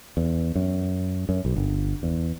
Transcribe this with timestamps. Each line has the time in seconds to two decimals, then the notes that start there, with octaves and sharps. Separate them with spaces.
0.17 E2
0.56 F#2
1.29 F#2
1.45 B1
1.56 G1
2.03 E2